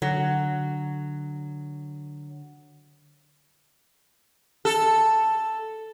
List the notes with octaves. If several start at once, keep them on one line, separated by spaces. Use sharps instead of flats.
D3 F#3
A4